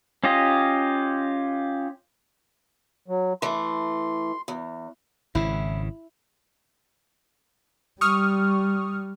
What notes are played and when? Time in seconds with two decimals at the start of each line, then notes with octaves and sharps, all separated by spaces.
0.24 C#4 F4 G4 D#5
3.08 F#3
3.42 E3 A3 C6
4.48 E2
5.35 G#1 C#3 E4
8.01 G3 C#6 D#6 F6